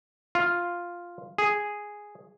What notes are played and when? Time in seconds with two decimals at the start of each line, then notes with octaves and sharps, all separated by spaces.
0.35 F4
1.38 G#4